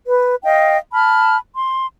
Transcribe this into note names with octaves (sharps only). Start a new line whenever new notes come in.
B4
D#5 F5 G5
A5 B5 F6
C6